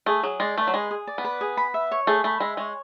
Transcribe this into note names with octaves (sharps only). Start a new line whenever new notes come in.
A3 G#4
F#3 G#4
G#3 D5
A3 B4
F#3
G#3 G#4
G#4
D5
B3
B4
G#4
B5
E5
C#5
A3 G#4
A3 B5
G#3 E5
G#3 C#5